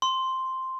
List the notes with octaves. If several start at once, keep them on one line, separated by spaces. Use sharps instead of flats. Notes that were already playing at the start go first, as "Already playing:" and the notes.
C6